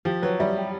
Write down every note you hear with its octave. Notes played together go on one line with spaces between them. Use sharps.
F3 G4
F#3 B4
G3 E5
G4